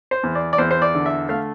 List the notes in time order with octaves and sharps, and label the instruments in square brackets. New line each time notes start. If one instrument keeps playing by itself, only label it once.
[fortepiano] C5
E2
D5
D5
E2 C5
C5
D5
D3
E5
A3 F5